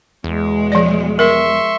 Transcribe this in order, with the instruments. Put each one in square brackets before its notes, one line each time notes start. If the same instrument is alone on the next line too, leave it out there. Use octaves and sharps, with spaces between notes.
[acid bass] E2 [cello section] B2 G#3
[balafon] F3 D5
[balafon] A#4 [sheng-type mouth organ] E5 C6 C#6